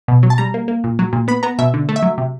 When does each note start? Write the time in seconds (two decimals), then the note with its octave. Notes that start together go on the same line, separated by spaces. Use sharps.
0.08 B2
0.23 F#3
0.30 A5
0.38 G3 A#5
0.54 A#3
0.68 A#3
0.84 A#2
0.99 F#3
1.13 A#2
1.28 B3 B5
1.43 B3 A#5
1.59 B2 E5
1.74 D3
1.89 A3
1.96 E5
2.03 F#3
2.18 C3